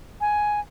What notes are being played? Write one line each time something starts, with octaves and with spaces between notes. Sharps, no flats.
G#5